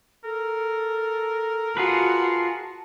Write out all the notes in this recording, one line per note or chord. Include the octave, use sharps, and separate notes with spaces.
A4 A#4
F4 F#4 G#4 B4 A5